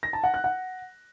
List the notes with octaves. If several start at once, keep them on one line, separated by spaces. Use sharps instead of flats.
A#6
A5
F#5
F#6
F#5